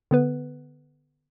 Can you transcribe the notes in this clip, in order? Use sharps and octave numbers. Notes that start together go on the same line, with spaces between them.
D3 B3 B4